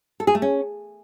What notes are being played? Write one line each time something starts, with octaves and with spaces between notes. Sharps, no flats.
A4
G#4
A3
C#4